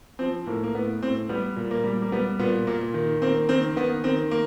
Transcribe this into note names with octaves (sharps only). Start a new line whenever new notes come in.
F3 C4
A2 A#3
A#3
A2 B3
A2 C4
G3 B3
A#2
A#3
G3
A#3
G3 B3
A#2 B3
A#2 A#3
D#3
A#3 C4
D#3 C4
D#3 B3
D#3 C4
A#3